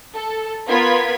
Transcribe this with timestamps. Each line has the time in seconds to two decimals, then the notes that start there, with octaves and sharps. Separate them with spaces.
0.15 A4
0.68 B3 F4 A#4 G#6 B6